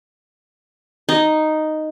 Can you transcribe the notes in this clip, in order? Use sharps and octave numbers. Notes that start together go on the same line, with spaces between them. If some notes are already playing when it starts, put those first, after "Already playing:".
D#4